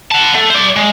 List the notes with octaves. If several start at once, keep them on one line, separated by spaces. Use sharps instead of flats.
F#5 A5
A3
C5 D5
G#3